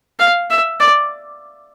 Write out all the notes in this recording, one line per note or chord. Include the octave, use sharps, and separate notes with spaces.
F5
E5
D5